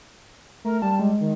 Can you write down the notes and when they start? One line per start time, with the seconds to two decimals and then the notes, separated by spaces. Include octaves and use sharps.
0.64 A3 A#4
0.82 G3 A5
0.99 G#3
1.20 D#3